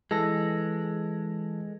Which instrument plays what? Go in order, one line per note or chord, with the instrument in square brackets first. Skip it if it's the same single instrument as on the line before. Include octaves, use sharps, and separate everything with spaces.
[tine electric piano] E3 A4 A#6 [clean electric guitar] G#3